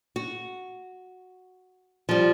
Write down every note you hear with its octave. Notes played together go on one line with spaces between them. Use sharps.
F#4
F3 G3